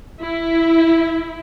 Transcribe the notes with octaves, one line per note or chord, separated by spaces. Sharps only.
E4